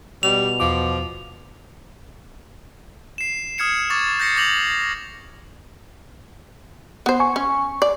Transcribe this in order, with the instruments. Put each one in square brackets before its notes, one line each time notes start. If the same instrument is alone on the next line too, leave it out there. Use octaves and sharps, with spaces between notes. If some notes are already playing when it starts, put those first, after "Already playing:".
[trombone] B2 [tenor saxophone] G3 [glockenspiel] F7
[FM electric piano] E2 D6 [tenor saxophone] F3
[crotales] C7 E7
D#6 F6 G#6 C#7 E7
C#6 D6 G#6 A6
G6 A6 A#6 C7 C#7
D6 G6 A#6 F7 F#7
[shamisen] B3 C5
[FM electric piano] G#5 C#6
[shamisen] C#4
D5